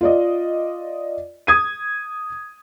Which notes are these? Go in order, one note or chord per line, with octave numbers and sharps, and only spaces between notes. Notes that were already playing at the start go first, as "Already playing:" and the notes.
F4 D5 D#5
D#6 G#6 D#7